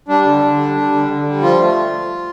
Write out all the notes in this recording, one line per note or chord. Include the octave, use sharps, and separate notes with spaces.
G3 D4
D3
D3
G3
G3
D3
D3
G3
F3 F4
A3